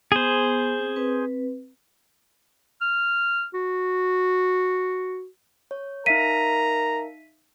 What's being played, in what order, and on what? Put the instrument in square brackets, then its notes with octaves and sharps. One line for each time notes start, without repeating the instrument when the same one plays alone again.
[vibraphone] B3 [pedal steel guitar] G#4 C5
[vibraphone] C4
C4 B4
[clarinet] F6
F#4
[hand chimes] C#5
[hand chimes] D#4 E5 F5 [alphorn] A#4 [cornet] A#5 [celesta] B6 D#7